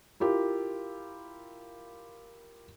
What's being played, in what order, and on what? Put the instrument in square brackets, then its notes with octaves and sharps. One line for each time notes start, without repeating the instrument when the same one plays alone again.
[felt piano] E4 F4 G4 A#4